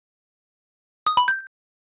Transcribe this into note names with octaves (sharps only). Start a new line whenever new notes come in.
D#6
B5
G6